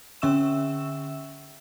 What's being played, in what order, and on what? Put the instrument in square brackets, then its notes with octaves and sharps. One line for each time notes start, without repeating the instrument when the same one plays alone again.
[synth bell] D3 C#4 E5 C#6 E6 E7